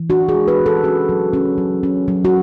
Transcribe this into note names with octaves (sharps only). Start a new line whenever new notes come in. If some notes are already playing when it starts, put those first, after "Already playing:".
Already playing: E3
D4 F#4
G#4
G#3
B4
E3
A4
C#4 F#4
F#3
C#4
F#3
C#4
F#3
F#4